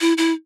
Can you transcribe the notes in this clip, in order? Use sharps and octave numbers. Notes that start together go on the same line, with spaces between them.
E4
E4